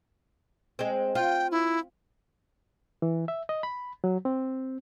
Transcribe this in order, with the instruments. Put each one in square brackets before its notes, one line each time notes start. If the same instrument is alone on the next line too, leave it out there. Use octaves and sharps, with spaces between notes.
[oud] G#3 C4
[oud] F4 [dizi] G5
[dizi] E4
[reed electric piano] E3
E5
D#5
B5
F#3
C4